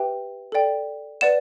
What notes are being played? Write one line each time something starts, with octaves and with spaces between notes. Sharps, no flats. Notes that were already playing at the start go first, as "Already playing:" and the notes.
Already playing: G4 B4 E5 G5
A4 D5 G5
B4 D5 F#5 E7